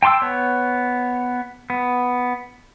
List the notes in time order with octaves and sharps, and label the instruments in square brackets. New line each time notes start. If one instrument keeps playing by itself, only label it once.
[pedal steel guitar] G5 A5 C6 D6 E6
B3 C#5
B3